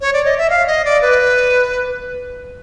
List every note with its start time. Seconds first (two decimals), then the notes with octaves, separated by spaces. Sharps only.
0.01 C#5
0.13 D5
0.25 D#5
0.38 E5
0.50 F5
0.67 D#5
0.85 D5
1.02 B4